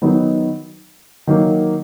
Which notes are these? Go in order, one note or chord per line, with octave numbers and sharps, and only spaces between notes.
D#3 F#3 B3 D#4
D#3 F#3 A#3